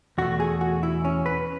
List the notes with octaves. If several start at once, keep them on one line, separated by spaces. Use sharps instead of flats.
E2 B2 A3 F#4
G#4
F#4
E4
C#4
B4